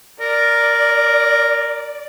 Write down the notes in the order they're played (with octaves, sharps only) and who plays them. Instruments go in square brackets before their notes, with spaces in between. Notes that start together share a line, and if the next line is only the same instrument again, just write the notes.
[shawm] A#4 [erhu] D5